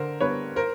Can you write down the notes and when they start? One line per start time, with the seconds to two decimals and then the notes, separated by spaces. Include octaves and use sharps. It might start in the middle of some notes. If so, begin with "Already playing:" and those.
Already playing: D3 A#4 C5
0.21 G3 B3 D4 B4 C#5
0.56 A#4 C5